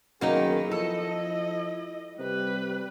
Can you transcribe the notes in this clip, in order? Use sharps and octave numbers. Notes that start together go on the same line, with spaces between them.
F#2 D#3 A#3 B3 D#4 G#4
F3 E4 A4 D#5
C3 G3 B4